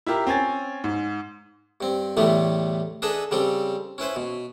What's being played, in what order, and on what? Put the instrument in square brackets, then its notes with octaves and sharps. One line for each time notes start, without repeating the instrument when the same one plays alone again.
[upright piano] E4 F4 G4 A#4
C4 C#4 G#5 A6
G#2
[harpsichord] G2 C4
E2 A2 D3 G3 A3 B3
D4 G#4 A4 B4 D#5 E5
C#3 G3 C4 G4 A4
C#4 E4 B4 C5
B2